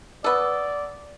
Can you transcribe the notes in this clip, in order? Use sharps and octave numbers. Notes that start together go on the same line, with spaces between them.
B3 A4 D5